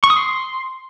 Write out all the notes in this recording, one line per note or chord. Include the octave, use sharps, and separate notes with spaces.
C#6
D#6
C6